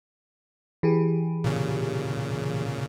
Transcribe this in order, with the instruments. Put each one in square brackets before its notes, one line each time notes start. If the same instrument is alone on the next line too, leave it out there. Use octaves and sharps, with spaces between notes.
[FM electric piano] E3 G4 G#4
[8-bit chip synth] A#2 C#3